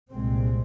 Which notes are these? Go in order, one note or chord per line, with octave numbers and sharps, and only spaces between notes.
C2 A#2 G#3 C4